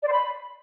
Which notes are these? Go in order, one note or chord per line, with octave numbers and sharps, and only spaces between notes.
D5
C5
B5